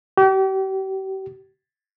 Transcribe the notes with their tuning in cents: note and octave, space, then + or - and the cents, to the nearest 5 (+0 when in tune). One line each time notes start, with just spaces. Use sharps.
G4 -40